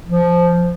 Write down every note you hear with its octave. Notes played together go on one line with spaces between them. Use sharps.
F3